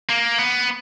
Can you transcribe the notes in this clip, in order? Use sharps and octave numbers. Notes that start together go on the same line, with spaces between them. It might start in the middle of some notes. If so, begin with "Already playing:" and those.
A#3
B3